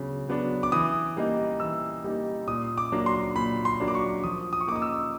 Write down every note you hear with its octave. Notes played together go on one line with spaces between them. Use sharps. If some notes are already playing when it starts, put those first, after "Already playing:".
Already playing: C#3 F#3 B3 D4
F#3 B3 D4
D6
E3 D#6
G3 A#3 D#4
E3 E6
G3 A#3 D#4
A#2 D#6
D6
F#3 A#3 D4
C6
A#2 B5
C6
F#3 A#3 D4
D6
C#6
F3 D#6
D#6
C#6
A#3 D#4 D6 D#6
E6